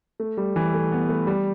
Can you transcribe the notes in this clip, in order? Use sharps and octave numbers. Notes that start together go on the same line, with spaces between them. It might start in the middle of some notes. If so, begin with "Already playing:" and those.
A3
G3
E3
A3
B3
A3
G3